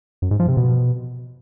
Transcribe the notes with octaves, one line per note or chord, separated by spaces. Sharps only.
F#2
G#2
F3
C3
B2